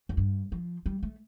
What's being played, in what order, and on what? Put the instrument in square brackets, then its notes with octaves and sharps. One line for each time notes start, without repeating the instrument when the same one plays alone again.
[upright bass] F2
G2
F3
G3
A3